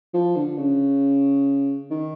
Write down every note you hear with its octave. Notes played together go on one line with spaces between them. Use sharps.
F3
D3
C#3
D#3